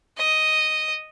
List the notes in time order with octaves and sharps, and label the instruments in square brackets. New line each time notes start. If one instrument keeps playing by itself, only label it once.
[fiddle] D#5